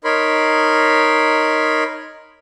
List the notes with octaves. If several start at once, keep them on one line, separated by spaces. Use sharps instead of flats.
D#4 A#4 C#5 B5 C6